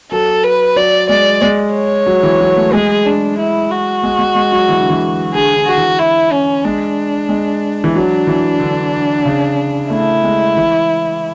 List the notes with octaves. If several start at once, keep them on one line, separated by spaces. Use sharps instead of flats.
F#3 A4
B4
F#3 D5
G#3 D5
G#3
C#5
F#3
E3
F#3
A3
G#3 G#4
D4
E4
F#4
G#3
G#3
G#3
F#3
E3
D3
E3
D3 G#4
D3
F#4
E3
E4
C#4
G#3 D4
G#3
E3
F#3 D4
E3
D3
C#3
A3 E4
G#3
E3